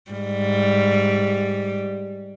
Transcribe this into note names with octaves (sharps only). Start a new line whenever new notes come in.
G#2 G3